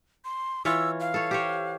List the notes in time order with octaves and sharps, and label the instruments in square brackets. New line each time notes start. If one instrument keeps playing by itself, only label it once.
[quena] C6
[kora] E3 F4 C#5 [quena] E6
[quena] F5
[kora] A4 C#5
G4 C5 C#5